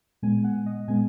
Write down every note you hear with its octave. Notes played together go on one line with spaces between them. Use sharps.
A#2 G#3 B3 G#5
F#5
D#5
A#2 G#3 B3 G#5